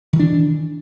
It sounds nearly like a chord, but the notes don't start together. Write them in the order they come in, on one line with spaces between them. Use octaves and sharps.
D#3 E3 D4